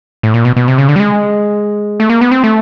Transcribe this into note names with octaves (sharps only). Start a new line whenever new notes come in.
A2
A#2
B2
B2
C3
C#3
D3
G3
G#3
A3
A#3
B3
C4
A3